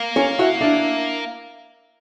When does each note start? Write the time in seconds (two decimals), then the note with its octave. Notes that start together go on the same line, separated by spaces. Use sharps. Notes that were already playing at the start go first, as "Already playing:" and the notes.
Already playing: A#3
0.16 C#4
0.39 E4 F#4
0.61 D4 E4